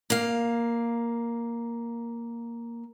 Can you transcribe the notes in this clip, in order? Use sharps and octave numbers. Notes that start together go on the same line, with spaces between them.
A#3 F5